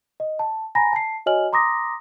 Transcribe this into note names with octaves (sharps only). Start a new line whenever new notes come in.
D#5
A5
G#5 A#5 B5 A#6
A5 C7
F#4 C#5 D#5 G#5 F6 F#7
A#5 C6 D6 D#6 A#6